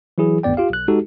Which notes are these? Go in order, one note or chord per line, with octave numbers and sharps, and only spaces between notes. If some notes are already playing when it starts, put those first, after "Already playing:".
E3 F#3 E4 G#4
G#1 D2 G2 B3 D5 G5
F4 G4 F5
B1 F#6
G#3 D#4 F#4 G4 A4